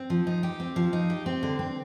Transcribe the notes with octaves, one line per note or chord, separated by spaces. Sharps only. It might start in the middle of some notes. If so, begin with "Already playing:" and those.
Already playing: C4
F3
D#4
G4
C4
F3
D#4
G4
C4
D3
C4